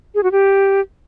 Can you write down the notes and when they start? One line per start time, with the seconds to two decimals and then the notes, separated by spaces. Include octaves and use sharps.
0.15 G#4
0.23 F#4
0.32 G4